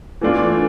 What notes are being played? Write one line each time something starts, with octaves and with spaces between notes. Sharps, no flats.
E3 A3 D4 F4